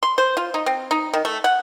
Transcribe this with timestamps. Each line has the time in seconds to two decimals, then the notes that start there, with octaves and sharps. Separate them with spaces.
0.03 C6
0.18 C5
0.37 F4
0.54 D#4
0.66 C4
0.91 D#4
1.14 D#3
1.25 A3
1.44 F#5